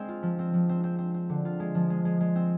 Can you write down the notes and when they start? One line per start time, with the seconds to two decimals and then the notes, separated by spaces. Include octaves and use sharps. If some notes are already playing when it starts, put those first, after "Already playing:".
Already playing: G#3 C4
0.08 F4
0.23 F3
0.39 C4
0.54 F3
0.69 C4
0.84 C4
0.99 C4
1.14 C4
1.29 D3
1.45 F4
1.60 G#3
1.75 F3
1.90 G#3
2.05 G#3
2.20 G#3
2.36 C4